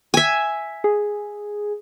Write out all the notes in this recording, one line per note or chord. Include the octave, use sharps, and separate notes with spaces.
E5 G#5
G#4